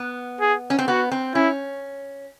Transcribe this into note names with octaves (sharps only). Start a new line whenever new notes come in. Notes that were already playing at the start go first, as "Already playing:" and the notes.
Already playing: B3
G#4
C#4
C4
B3 F#4
C4
C#4 E4